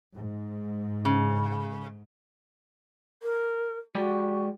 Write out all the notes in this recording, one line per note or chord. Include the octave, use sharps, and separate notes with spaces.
G#2
C#3
A#4
G#3 F#4 G4 D5